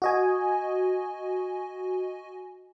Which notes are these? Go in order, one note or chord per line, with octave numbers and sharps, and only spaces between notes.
F#4 D#5 G#5